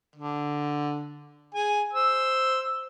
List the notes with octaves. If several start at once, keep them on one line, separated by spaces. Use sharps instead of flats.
D3
G#4 G#5
C5 E6